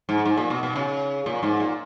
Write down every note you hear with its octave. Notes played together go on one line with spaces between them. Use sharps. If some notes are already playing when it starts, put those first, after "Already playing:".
G#2
G#2
A#2
B2
B2
C#3
A#2
G#2
A#2